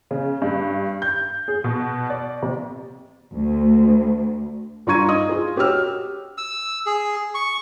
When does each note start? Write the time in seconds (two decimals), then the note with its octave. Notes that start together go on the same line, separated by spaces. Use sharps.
0.11 C#3
0.42 G2
1.02 G6
1.48 G#4
1.64 B2
2.10 D5
2.43 C3
3.34 D2
4.87 G2 F4 A#5 C#6 G#6 D#7
5.08 D#4 D#5 D#6
5.29 F4 G#4
5.56 F#4 G4 C#5 E6 F6
6.38 E6
6.86 G#4
7.35 C#6